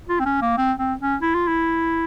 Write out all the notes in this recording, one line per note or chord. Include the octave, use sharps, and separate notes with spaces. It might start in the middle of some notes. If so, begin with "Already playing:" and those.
F4
C4
C#4
A#3
C4
C4
C#4
E4
F4
E4